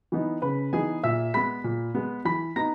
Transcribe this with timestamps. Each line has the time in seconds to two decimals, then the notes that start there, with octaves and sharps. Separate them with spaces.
0.12 E3 B3 D#4
0.42 C#3 B4 B5
0.73 E3 B3 D#4 G#4 G#5
1.03 A#2 E5 E6
1.34 G#3 B3 B5 B6
1.64 A#2
1.95 G#3 B3
2.25 E3 B5 B6
2.56 B3 D#4 A#5 A#6